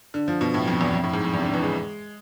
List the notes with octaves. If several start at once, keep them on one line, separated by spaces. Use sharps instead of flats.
D3
F3
B2
A2
F2
E2
F2
A2
G#2
F2
E2
C3
D3
E3
G#3